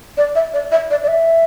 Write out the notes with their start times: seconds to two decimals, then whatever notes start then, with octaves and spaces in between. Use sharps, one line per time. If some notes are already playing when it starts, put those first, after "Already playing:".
0.17 D5
0.35 E5
0.54 D5
0.72 E5
0.91 D5
1.03 D5
1.08 E5